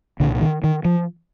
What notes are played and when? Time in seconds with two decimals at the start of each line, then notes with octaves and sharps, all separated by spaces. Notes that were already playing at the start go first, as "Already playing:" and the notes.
0.20 C2 A#2 D3
0.41 D#3
0.64 D#3
0.85 F3